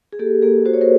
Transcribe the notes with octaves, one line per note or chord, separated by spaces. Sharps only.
G#4
A#3 G4 A4
A#3 G#4 A#4
F#4 C5
C#5
A#4 C5